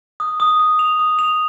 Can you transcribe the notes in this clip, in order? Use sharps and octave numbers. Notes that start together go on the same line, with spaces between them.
D#6
D#6
D#6
F7
D#6
F7